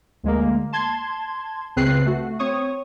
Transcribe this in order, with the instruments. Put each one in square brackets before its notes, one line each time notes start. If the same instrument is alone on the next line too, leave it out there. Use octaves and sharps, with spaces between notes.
[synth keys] D2 G#3 A#3
A5 C6 G#6
C#2 C#3 C4 B4 F#6 C7
A3 F#4
C4 C#5 C#6 D#6